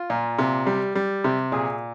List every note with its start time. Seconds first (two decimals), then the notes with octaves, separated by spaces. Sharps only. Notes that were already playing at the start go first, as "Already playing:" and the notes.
Already playing: F4
0.10 A#2
0.39 C3
0.67 G3
0.95 G3
1.24 C3
1.52 A#2 G#4